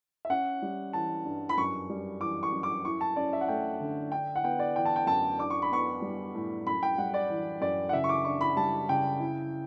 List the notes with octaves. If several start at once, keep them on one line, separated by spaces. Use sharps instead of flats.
E5
C#4 F#5
G3
E3 A5
G2
B5
F#2 C#6
G3
E3 D6
C#6
F#2
D6
E4 C#6
A5
C#4 D5
E5
F#5
A3 G5
D3
D4 G5
F#5
B3 G5
D5
E3 G5
A5
G5
F#2 A5
D4 D6
C#6
B5
B3 C#6
G3
A2
F#2 B5
G5
G3 F#5
D5
E3
F#2 D5
F#5
C#3 E5
C#6
D6
D4 C#6
B5
G3 A5
C#3 G5
E4